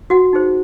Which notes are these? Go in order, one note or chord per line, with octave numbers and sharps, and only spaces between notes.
F#4 F#5
D#4 G#4 C5